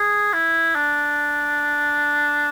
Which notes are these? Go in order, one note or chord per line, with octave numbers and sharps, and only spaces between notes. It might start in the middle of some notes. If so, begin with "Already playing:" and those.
Already playing: G#4
E4
D4